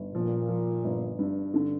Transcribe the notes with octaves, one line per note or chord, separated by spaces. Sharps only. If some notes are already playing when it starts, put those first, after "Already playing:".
Already playing: G1
A#2 F3
F3
G1
G2
D3